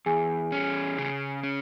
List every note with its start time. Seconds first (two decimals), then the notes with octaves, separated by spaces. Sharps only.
0.06 E2 G#4 G#5
0.52 C#4
0.98 C#3
1.43 C#4